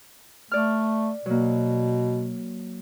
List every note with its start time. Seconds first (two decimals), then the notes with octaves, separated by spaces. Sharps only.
0.52 A3 D5 F6
1.26 B2 F#3 A#3